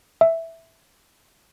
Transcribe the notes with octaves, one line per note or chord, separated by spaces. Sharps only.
E5